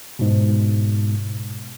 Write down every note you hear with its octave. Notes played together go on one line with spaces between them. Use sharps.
G#2 B2